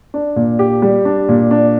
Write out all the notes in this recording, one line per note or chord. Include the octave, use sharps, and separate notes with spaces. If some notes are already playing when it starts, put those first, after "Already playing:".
D4
A#2
G4
G3
D4
A#2
D4